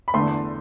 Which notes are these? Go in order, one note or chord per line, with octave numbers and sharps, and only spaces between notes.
B5
E2 D3 A3 C6